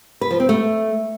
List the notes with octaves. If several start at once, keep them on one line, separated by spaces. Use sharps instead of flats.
B4
F3
C4
A3